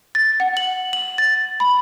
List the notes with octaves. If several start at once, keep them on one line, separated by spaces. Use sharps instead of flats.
A6
F#5
F#7
F#7
A6
B5